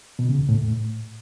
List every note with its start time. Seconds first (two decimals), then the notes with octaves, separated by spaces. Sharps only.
0.19 B2
0.29 C#3
0.39 E2
0.49 A2